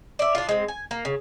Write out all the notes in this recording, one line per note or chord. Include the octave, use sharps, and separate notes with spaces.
D5 E5
D4 F4
G#3 C4
G#5
A#3
C#3